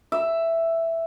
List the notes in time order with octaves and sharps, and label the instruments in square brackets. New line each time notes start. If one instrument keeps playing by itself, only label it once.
[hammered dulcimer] E5